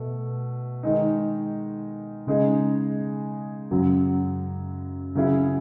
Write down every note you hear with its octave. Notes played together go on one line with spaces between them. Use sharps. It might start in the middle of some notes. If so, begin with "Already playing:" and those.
Already playing: B2 A3
D#3 G#3 D#4
C#3 G#3 D#4 G#4
F#2 C#3 F#3
C#3 F#3 C#4 E4 G#4